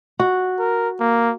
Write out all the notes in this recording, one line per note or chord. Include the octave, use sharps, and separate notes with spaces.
F#4
A#4
A#3